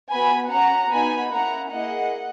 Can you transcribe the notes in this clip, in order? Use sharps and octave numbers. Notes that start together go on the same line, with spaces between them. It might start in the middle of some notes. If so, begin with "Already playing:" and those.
B3 F#4 G#5 B5
C#4 F#4 F#5 A#5
B3 D#4 F#4 G#5 B5
A#3 C#4 E4 F#5 A#5
A#3 E4 G#4 D#5 F#5